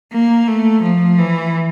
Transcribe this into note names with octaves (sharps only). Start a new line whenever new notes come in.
A#3
A3
F3
E3